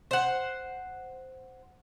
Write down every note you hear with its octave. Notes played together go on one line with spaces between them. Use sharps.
C5 F#5